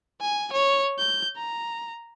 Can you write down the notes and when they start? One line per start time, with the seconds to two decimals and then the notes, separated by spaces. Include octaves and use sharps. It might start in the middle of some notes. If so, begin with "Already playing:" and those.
0.21 G#5
0.52 C#5
0.98 G6
1.37 A#5